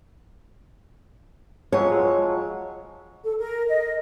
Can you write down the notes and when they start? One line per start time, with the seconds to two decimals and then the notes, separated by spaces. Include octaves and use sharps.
1.72 F3 F#3 G#3 C#5
3.23 A4
3.37 A#4
3.67 D#5